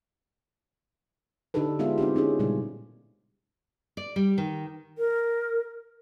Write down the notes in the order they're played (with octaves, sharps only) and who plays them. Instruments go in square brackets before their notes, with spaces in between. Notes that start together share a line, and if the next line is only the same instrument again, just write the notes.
[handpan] D3 D4 D#4 G4 A4 B4
G#3 B3 F4 G#4 E5
C4 D#4 E4 G4
C4 C#4 D#4 G#4
A#2 C#3 G3 G#3
[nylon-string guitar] D5
G3
D#3
[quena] A#4